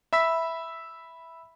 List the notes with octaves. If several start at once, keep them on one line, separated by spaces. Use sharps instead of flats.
E5 B5 E6 B6